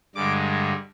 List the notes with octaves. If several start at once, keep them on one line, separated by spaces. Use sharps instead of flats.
G2 D3 G#3 D6